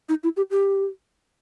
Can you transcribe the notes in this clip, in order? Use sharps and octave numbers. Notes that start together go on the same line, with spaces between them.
D#4
E4
G4
G4